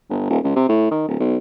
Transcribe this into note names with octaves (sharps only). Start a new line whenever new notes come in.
G1
D#1
C#2
C3
A2
D#3
D1
B1